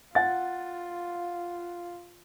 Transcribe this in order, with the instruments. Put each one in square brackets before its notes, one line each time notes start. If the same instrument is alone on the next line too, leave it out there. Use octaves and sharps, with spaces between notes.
[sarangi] F4 [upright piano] F#5 A6